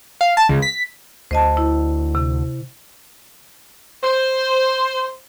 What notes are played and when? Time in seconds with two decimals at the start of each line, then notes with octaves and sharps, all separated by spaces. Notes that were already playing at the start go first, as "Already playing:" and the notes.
0.21 F5
0.37 A5
0.49 C#2
0.62 B6
1.31 D2 C5 D#5 A5
1.57 E4
2.15 C3
4.04 C5